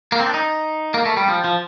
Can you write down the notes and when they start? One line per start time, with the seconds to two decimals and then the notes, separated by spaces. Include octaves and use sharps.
0.12 A#3
0.20 C4
0.26 D4
0.34 D#4
0.94 A#3
1.05 A3
1.17 G3
1.29 F3
1.44 F3